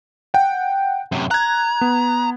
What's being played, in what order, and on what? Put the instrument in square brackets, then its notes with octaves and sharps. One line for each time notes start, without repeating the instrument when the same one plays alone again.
[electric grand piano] F#5 G5
[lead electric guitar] F#2 C3
[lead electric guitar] A#5 [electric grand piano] F#6 G#6
[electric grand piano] B3